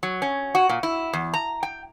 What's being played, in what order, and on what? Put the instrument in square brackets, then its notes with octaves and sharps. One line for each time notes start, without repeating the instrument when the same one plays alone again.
[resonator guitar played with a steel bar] F#3
C#4
F#4
A#2
E4
E2
A#5
G5